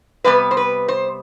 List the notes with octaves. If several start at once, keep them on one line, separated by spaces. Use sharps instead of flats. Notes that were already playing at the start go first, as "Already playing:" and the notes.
C3 G3 B3 B4
C5
B4
C5